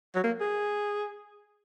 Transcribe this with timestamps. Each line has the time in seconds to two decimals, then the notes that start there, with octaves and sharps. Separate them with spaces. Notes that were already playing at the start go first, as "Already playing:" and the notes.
0.15 F#3
0.23 A#3
0.40 G#4